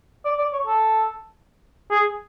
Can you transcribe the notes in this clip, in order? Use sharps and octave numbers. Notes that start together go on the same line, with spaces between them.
D5
D5
C#5
A4
G#4